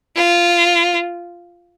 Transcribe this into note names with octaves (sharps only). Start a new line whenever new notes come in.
F4